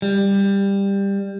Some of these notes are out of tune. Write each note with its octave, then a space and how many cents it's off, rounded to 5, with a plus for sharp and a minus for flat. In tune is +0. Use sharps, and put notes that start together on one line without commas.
G3 +15